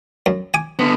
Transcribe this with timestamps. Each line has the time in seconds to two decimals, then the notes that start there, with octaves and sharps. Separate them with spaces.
0.26 F#2
0.54 G#5 D6
0.79 D3 B3